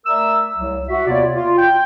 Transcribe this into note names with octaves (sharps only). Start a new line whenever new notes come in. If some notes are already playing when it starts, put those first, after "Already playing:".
A3 A#4 D5 E5 E6
C2 F#3
F#4 E5
D#2 C3 B3 F4 C#5 D5
F4
G5